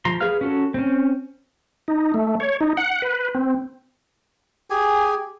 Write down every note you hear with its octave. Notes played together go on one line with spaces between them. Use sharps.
F3 A#5 C6
G#4 B4 F5 F6
C#4 F#4 A4
C4 C#4
D#4
A3
C#5
D#4
F#5
B4
C4
G4 G#4 G#5